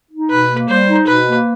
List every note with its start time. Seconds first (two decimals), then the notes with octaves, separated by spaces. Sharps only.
0.12 D#4
0.30 B2 B4
0.50 A#3
0.68 G3 C5
0.88 D#4
1.07 B2 B4
1.26 A#3